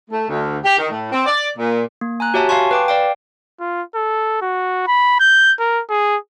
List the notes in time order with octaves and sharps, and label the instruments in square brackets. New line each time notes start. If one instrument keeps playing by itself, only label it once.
[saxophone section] A3
D2
G4
D#3
A2
C4
D5
A#2
[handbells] A#3
G#5 A#5 F#6
F#4 G4 C#5 E5 G#5 A5
F5 G#5 A5 C6 C#6
B4 G5 D6
D5 F5 G5
[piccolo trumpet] F4
A4
F#4
B5
G6
A#4
G#4